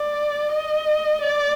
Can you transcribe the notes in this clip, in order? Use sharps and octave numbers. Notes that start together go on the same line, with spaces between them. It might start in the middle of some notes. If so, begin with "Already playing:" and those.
Already playing: D5
D#5
D5